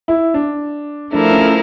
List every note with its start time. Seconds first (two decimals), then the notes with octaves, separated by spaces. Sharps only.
0.08 E4
0.34 D4
1.13 F3 A3 D4 E4 A#4
1.32 C#4